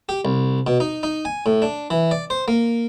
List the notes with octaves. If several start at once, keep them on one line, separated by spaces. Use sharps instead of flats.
G4
C2
B2
D#4
D#4
G#5
A2
D4
E3
D5
C5
A#3